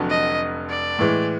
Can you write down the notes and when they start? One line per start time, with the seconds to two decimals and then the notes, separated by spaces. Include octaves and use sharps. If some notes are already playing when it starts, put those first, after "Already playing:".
Already playing: F1 F2 D3 F#3
0.10 D#5
0.69 D5
0.99 A2 E3 G#3